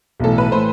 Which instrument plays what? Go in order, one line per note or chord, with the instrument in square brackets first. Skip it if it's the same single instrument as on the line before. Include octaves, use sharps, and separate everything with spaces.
[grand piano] B1 A2 E3 [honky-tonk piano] A4
[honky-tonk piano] B4
[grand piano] A2 E3 [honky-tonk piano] C5